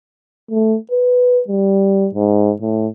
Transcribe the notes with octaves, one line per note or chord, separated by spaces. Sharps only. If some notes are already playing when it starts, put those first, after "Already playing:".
A3
B4
G3
G#2
A2